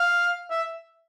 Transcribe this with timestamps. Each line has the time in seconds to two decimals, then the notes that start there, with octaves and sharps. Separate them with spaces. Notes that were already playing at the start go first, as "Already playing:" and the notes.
Already playing: F5
0.50 E5